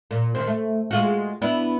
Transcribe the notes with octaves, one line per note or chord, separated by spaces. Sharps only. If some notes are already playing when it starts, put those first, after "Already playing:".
A#2
D#3 C4
A3
G#3 F4 F#4
B3 D4 E4